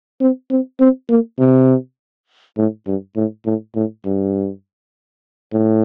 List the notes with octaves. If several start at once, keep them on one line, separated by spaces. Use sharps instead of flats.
C4
C4
C4
A#3
C3
A2
G2
A2
A2
A2
G2
A2